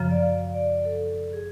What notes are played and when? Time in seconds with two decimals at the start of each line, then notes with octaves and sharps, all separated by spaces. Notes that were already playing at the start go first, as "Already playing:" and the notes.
Already playing: F#2 C#3 F3
0.11 D5
0.22 F5
0.54 D5
0.85 A4
1.33 G#4